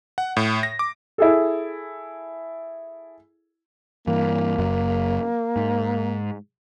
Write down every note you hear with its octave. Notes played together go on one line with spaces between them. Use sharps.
F#5
A2
A#6
D6
E4 G#4 A4
G2 E3 A#3
F#1 F#2 F#3
G#2